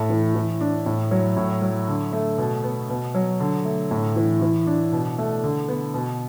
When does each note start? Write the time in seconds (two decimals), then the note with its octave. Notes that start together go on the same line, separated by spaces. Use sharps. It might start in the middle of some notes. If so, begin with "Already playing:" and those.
Already playing: A2 A3
0.09 E3
0.35 E3
0.61 D4
0.86 A2
1.11 F#3
1.37 A2
1.62 F#3
1.88 D3
2.13 A3
2.38 B2
2.64 B3
2.89 B2
3.15 F#3
3.40 D3
3.65 A3
3.91 A2
4.16 E3
4.42 E3
4.67 D4
4.92 B2
5.18 A3
5.44 D3
5.68 B3
5.94 B2